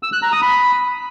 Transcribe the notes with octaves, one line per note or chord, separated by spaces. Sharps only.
E6
F#6
A#5
D#6
B5